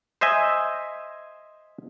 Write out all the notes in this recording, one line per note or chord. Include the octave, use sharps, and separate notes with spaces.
C5 D#5 E5 G#5